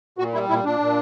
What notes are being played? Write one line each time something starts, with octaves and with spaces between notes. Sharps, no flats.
A#2 F#4
G3 E4
A#2 E4
A#2 D4
A#2